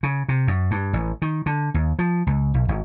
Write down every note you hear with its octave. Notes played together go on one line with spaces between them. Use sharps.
C#3
C3
F#2
G2
A1
D#3
D3
D#2
F3
C#2
B1
G#1